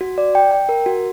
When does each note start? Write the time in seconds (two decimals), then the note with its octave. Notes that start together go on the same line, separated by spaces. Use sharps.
0.01 F#4
0.18 D5
0.35 G5
0.51 G5
0.69 A#4
0.86 F#4